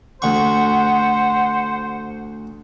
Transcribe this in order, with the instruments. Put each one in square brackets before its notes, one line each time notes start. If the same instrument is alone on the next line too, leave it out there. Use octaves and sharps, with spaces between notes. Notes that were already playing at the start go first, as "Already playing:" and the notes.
[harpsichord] D2 C#6 [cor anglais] C5 [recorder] F#5